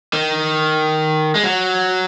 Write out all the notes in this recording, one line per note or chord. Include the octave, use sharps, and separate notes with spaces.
D#3
G#3
F#3